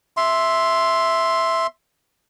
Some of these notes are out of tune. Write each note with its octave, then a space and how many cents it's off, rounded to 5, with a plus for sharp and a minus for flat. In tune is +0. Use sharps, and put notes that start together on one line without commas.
E5 +0 C6 +0